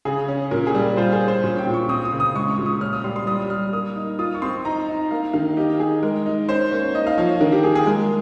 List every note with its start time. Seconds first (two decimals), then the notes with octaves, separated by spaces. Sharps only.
0.05 C#3 G#4
0.28 C#4
0.51 A#2 A#4
0.67 G#4
0.75 G3
0.82 A#4
0.97 F4 C5
1.12 G#4
1.20 C#4
1.28 C5
1.43 A#2 C#5
1.58 G5
1.67 A#2
1.74 C#6
1.89 C4 D#6
2.05 D#6
2.12 C#3
2.20 D#6
2.35 G#3 C#6
2.51 C#6
2.58 A#2
2.66 D#6
2.81 C#4 F6
2.93 D#6
3.04 G3 C6
3.16 C6
3.27 G3 D#6
3.50 G3 F6
3.73 A#3 D#6
3.96 D#4
4.19 F4 D#6
4.35 C#6
4.42 C4 C6
4.65 D#4 A#5
4.88 D#4
5.11 A#3 F5
5.33 D#3 F5
5.57 D#4 G4
5.80 D#4 G#4
6.03 G#3 A#4
6.26 D#4
6.49 C#4 C5
6.72 A#3 C#5
6.95 D#4 D#5
7.07 F5
7.18 F3 C#5
7.41 D#3 A#4
7.52 G4
7.63 A#3 G#4
7.75 G#4
7.87 G#3 A#4